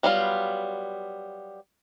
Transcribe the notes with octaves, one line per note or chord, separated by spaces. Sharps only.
F#3 G3 B3 D#4 F4